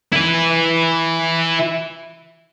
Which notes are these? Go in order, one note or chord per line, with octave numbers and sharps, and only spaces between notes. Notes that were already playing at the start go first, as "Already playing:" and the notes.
E4 B4